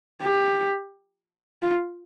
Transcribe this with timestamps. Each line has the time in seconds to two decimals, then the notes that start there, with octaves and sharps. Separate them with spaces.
0.23 G4
1.62 F4